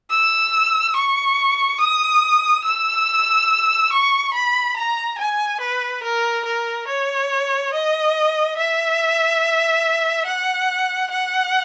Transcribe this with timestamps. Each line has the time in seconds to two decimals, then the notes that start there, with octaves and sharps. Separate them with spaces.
0.11 E6
0.96 C#6
1.80 D#6
2.64 E6
3.92 C#6
4.34 B5
4.76 A#5
5.18 G#5
5.60 B4
6.03 A#4
6.45 A#4
6.87 C#5
7.73 D#5
8.57 E5
10.26 F#5
11.11 F#5